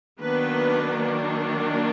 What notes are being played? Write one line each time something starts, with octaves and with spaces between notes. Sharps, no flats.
D#3 F#3 A#3 B3 D4 B4